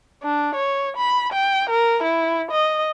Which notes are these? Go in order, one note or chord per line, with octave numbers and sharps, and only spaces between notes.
D4
C#5
B5
G5
A#4
E4
D#5